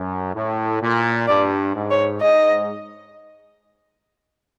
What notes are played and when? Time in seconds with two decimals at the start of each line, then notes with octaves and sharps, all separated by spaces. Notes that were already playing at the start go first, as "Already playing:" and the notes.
Already playing: F#2
0.35 A2
0.82 A#2
1.28 G2 D5
1.75 G#2
1.90 C#5
2.22 G#2 D#5